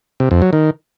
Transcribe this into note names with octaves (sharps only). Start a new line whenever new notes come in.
C3
F2
F#3
D#3